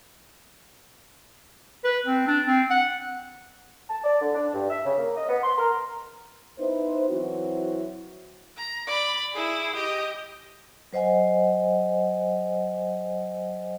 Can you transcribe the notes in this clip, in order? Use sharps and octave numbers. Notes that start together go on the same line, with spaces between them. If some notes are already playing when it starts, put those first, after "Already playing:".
B4
C4
D4
C4
F#5
A5
D5
D3
D4
G2
E5
C#3
A#3
D#5
B3
C6
A#4
B3 D#4 E4 B4 C5
E3 F#3 C4 E4 F#4
A#5
D5 B5
E4 G#4
G4 D#5
F#3 C5 D#5 F#5 G#5